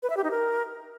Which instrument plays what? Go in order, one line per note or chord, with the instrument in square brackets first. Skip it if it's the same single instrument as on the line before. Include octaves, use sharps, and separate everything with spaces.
[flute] B4
E5
G4
D#4
A#4